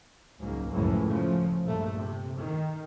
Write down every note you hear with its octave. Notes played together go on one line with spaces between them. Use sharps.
C#2 G#2 F#3 A#3
C#2 F#2 A2 C#3 E3 F3
C#3 F3 A3
A#1 G2 A3
C3
D#3